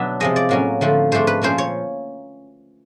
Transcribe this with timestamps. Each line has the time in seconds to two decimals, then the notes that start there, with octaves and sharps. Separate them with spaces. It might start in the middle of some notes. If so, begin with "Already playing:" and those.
Already playing: B2 F#3 B3 D4 E5
0.20 C3 F3 G#3 D#5
0.36 D5
0.49 A2 F#3 A#3 C#4
0.81 D3 F3 A3 C4
1.12 G#2 F3 A3 D4 C5
1.27 B4
1.42 A#2 F3 A#3 C#4 C5
1.58 C#5